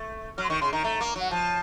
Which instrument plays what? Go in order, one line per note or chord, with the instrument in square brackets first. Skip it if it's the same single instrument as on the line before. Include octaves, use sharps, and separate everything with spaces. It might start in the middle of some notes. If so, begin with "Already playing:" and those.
Already playing: [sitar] A3
[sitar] F#3 [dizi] F6
[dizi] C6
[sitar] D#3 [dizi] C#6
[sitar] C#3 [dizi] C6
[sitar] D#3 [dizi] A#5
[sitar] A3
A#3
[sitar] F#3 [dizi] F#5
[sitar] F3 [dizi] A5